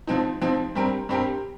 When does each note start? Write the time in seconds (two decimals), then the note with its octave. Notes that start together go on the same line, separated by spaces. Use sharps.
0.07 F2 F3 C4 D#4
0.42 F2 F3 C4 D#4
0.75 G2 G3 C4 G4 A#4
1.09 G2 G3 C4 G4 A#4